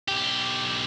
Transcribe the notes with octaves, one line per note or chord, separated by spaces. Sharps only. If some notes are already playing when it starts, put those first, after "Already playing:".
B1 G4